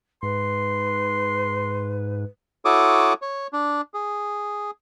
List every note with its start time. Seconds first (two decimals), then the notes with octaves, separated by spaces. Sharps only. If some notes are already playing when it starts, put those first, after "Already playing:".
0.23 G#2 B4 C6
2.65 E4 F#4 A4 C#5 D6 D#6
3.22 C#5
3.53 D4
3.94 G#4